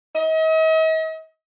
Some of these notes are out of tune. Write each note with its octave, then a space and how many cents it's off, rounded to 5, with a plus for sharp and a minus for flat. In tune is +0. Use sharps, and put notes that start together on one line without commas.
D#5 +45